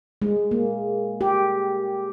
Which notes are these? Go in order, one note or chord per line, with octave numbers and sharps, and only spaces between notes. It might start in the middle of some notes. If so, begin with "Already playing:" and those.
G#3
A#3
G4